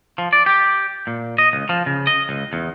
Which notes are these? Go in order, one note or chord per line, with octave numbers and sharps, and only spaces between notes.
F3
D5
G4
A#2
D#5
C#2
F3
C#3
D#5
C#2
E2